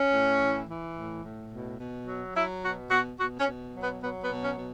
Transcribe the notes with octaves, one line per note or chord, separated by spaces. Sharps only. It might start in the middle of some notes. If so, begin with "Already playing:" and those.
Already playing: C#4
A2
E3
E3
A2
A2
B2
B2
F#3
F#3 E4
B2 F#4
B2 F#4
B2 F#4
C#4
B2
F#3
B3
F#3 B3
B3
B2
C#4
B2